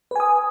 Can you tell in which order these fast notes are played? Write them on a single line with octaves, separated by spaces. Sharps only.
B4 G#5 D#6